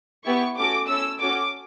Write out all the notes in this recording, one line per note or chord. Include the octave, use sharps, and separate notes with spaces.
B3 E4 G4 C#6
A3 C#4 F#4 A4 D6
C#4 E4 A4 E6
C#4 F#4 A4 D6